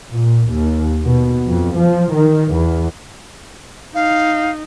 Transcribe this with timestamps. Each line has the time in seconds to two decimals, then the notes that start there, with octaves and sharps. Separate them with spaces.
0.11 A#2
0.51 D#2
1.05 B2
1.47 F2
1.79 F3
2.13 D#3
2.53 E2
3.95 D#4 F5